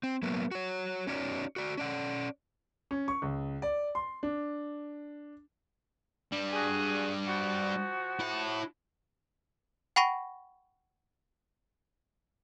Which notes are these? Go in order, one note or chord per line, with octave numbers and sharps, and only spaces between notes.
C4
F#3 A#3 B3
F#4 C#5
C#4 D#4 F#4 C#5 D5
F#4 D5
C#4 D5 F#5
C#4
C#6
C#2
D5
C6
D4
G3 D4
F#4 G#4
F3 F#4
E4 A5
F#5 G5 B5 C#6 A#6 D#7